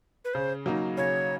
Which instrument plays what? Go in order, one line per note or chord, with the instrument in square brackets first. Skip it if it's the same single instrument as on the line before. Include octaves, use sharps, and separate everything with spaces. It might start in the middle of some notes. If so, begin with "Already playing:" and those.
[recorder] B4
[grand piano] C#3 [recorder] C5
[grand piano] F#3 A#3 D#4
[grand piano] C#3 [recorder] C#5